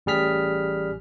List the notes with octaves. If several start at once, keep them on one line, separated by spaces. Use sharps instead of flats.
A1 G3 G#4 F6 B6